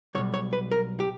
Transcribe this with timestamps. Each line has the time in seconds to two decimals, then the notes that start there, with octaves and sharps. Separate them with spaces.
0.15 B1 B2 G3 C#5
0.34 C#5
0.53 B4
0.71 A#4
1.00 G4